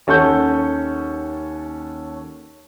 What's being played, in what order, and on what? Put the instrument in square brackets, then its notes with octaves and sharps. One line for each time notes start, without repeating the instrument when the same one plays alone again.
[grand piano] D#2 C#4 A4 F#5 C#6 G6